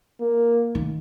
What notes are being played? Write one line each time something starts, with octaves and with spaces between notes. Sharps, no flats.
A#3
D#3